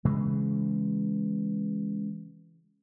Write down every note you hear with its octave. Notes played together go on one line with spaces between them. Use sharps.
C#3 E3 G#3